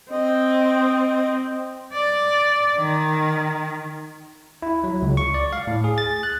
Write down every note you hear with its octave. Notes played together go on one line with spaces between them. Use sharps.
C4 D#5
D5
D#3
E4
F#3
C#2
C#6
D5
F5
A2
G#4
A6
F#6